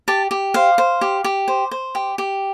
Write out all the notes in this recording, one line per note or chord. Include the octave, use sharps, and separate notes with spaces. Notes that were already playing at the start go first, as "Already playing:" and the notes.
G4 A5
G4
C5 F5
C5
G4
G4
C5
C5
G4
G4